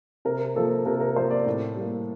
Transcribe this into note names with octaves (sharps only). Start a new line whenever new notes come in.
C3 A#4
F3 A#3 A4
C3 A#4
A#4
F3 A#3 C5
D5
A2
G3 A#3